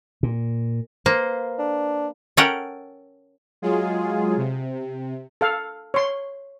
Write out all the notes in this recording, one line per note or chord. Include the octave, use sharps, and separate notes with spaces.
A#2
A#3 B4 C5
D4
C#4 A4 A#4 F#5 G5
F#3 G#3 F4 G#4
C3
A4 F5
C#5 C6